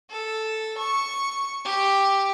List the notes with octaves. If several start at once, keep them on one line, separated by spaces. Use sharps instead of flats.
A4
C#6
G4